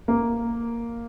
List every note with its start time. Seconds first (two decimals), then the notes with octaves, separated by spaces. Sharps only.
0.08 A#3